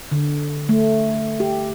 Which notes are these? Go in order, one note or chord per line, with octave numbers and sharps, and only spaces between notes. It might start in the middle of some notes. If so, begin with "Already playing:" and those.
D3
A3
G4